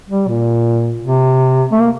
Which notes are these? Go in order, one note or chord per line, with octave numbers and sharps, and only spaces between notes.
G3
A#2
C3
A3
A#3